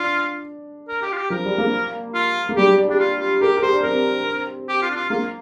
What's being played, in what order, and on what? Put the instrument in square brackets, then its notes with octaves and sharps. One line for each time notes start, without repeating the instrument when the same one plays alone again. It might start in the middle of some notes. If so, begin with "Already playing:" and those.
Already playing: [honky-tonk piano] D4 [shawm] F4
[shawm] A#4
G4
F4
G4
[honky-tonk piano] F3 [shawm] A#4
[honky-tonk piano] G3
A#3
[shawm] F4
[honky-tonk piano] A#3
[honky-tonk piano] G3 [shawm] G4
[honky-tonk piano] G3
D4
[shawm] D4 [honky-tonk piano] G4
[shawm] F4
F4
[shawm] G4 [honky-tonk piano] A#4
[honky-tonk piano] A#4
[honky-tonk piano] G4 [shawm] C5
[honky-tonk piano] D4
[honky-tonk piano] C4 [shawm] A#4
[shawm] G4
F4
D4
F4
[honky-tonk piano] A#3 [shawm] F4